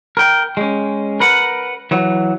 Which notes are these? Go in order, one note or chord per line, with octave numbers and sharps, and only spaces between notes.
A#4 G5
G#3 C#4
A#4 B4 F#5
E3 F#3